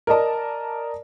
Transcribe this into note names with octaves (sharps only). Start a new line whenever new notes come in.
A#4 D5 D#5 A5 A#5